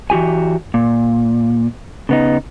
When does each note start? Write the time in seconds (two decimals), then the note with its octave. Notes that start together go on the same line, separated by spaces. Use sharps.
0.10 E3 F#4 G4 G#5
0.74 A#2
2.09 C#3 B3 D#4